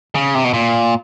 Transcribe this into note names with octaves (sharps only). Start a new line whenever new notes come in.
C#3
C3
B2
A#2